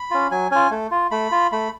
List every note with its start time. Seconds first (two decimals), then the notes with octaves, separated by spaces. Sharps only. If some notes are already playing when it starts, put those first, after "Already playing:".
Already playing: B5
0.11 C#4 F4
0.31 F#3 G#5
0.51 C#4 F4 G#5
0.71 A3
0.91 F4
1.11 A3 B5
1.31 F4
1.52 A3 B5